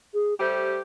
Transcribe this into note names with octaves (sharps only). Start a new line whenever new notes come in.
G#4
G3 A3 G4 C5